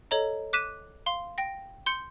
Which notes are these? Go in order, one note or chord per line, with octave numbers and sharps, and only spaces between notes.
A4 C#5 D#5 A#5
D6 F#6 B6 D#7 E7
F5 C6
G5 A#6
C6 G6 C#7